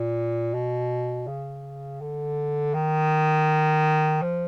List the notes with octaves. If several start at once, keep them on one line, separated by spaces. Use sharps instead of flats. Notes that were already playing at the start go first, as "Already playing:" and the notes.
Already playing: A#2
B2
C#3
D3
D#3
F3